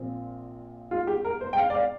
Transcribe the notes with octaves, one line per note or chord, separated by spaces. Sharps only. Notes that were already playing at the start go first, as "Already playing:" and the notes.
Already playing: A#1 A#2 F3 C4
F4
G4
A#4
C5
G5
F5
D5
F5